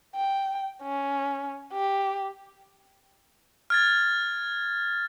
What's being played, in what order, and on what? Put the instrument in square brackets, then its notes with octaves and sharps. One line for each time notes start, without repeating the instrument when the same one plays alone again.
[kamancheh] G5
C#4
G4
[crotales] F6 G#6 A6